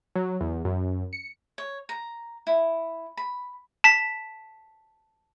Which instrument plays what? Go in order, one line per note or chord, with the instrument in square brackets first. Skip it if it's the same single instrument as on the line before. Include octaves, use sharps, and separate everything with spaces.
[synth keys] F#3
E2
F#2
C#7
[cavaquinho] C#5
A#5
E4
B5
[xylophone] A5 B6